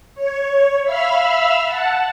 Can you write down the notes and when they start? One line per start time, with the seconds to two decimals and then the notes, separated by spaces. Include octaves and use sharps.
0.15 C#5
0.83 E5 F5 B5 E6 F6
1.65 F#5 A5